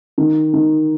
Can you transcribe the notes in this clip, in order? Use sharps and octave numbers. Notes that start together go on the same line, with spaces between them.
D#3
D#3